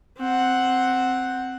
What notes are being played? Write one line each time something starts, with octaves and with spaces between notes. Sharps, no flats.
C4 F#5